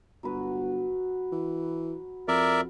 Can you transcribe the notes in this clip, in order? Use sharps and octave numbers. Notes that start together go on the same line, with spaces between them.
G1 F#3 F#4 B4
E3
F2 A#4 D5 E5